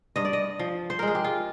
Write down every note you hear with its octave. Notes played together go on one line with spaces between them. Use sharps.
G2 D#5
D5
D#5
F3
C5
G#3 A#4
G#4
G4
F4